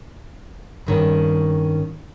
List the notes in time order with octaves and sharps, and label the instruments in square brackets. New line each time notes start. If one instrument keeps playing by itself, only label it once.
[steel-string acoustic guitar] G2 D#3 C#4